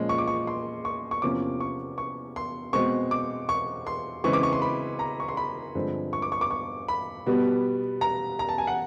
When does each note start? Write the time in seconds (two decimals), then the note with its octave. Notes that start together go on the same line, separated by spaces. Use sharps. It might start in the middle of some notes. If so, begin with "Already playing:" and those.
Already playing: A#2 F3 G#3 C#4
0.09 C#6
0.18 D6
0.27 C#6
0.47 C6
0.85 C#6
1.11 C#6
1.22 E2 C3 F3 A#3 C#4 D6
1.60 C#6
1.98 C#6
2.36 C6
2.73 B2 G#3 C4 C#6
3.11 D6
3.49 C#6
3.87 C6
4.24 C#3 E3 G#3 C4 C#6
4.33 D6
4.43 C#6
4.53 C6
4.62 B5
4.99 A#5
5.20 C#6
5.28 C6
5.37 B5
5.75 G2 D3 F3 G#3 C4
6.13 C#6
6.22 D6
6.32 C#6
6.41 D6
6.51 C#6
6.88 B5
7.26 B2 G3 B3
8.01 A#5
8.39 A#5
8.49 A5
8.58 G#5
8.67 F#5